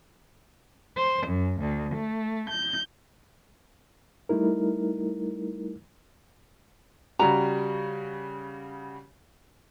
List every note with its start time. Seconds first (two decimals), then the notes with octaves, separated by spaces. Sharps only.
0.96 C5
1.26 F#2
1.59 D2
1.94 A3
2.48 G6
4.29 G3 A3 D#4 E4 A#4
7.19 C#3 G3 F#4 A#5